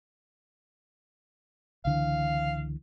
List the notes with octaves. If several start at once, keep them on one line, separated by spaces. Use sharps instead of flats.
C#2 D3 E3 F5